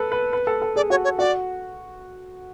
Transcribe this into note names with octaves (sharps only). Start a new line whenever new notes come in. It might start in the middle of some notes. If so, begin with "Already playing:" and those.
Already playing: A4 B4
B4
B4
A4
A4
G#4 D5
F#4 C#5
C#5
F#4 D5